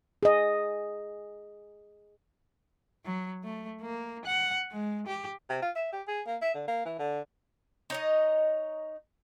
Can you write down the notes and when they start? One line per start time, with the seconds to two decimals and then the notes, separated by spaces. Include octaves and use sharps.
0.23 G#4 D#5
3.05 F#3
3.43 A3
3.81 A#3
4.25 F#5
4.72 G#3
5.07 G4
5.49 C3
5.62 F4
5.75 E5
5.92 G4
6.08 G#4
6.27 A#3
6.42 E5
6.54 D3
6.67 A#3
6.85 E3
6.99 D3
7.90 D#4 C#5 D#5